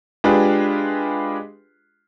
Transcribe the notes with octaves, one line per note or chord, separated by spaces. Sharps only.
G#3 D4 F4 G4 G#4 B4